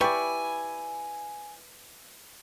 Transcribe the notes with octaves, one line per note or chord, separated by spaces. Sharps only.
E4 G4 B4 D5 G#5 C#6